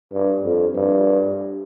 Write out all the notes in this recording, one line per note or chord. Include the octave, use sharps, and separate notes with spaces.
G2
F2
G2